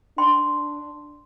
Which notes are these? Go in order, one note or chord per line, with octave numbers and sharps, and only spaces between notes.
D4 G5 C6